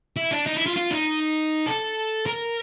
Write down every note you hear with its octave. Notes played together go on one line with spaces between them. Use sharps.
E4
D4
D#4
E4
F4
F4
D#4
A4
A#4